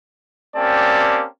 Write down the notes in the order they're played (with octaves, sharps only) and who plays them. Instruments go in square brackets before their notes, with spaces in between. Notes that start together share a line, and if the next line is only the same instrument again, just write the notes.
[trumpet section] A#3 C4 C#4 G4 D5 A5